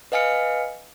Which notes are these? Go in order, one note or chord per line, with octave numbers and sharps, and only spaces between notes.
B4 D#5 F5 G#5 F6 C#7